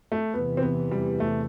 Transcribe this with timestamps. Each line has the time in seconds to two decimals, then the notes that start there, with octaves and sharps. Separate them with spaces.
0.12 A3
0.33 E2 C3 E3 B3
0.57 C4
0.62 B3
0.91 G3
1.20 A3